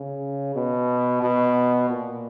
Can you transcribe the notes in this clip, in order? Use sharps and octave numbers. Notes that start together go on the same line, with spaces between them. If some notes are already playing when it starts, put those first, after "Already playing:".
Already playing: C#3
B2
B2
A#2